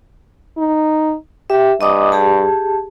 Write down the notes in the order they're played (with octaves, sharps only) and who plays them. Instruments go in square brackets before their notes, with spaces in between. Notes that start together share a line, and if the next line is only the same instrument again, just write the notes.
[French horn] D#4
[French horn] G4 [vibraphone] E5
[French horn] G2 [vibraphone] D#5 D6 D#6
[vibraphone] G4 G#4 A5